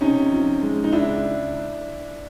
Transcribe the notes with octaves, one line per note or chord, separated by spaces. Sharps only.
C3 C#4 D#4
F3
G#3
D#4
C#2 D4 E4